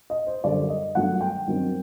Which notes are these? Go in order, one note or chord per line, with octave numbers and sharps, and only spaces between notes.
D#5
C5
F#2 D3 G3 D4 D5
D#5
G2 D#3 F#3 A3 F#5
G5
G2 D#3 F#3 C4